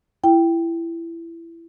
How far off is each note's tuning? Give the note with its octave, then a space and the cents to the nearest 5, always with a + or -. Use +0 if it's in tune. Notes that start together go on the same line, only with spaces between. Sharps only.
E4 +20 G5 +0